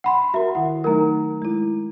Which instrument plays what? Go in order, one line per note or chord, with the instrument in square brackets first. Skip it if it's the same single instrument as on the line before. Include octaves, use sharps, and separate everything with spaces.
[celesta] F#5 B5 C6
[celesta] F#4 E5 [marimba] A#4 A#5
[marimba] D#3 E4 [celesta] F#5
[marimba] F#3 A3 D#4 [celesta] A#4 A#5
[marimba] G#3 E4